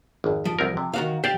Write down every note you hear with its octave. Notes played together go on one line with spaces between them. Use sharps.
G#1 F2
F3
C2 C4 A#4
C3
D#3 F#4 F5
G4 C5 D5 F5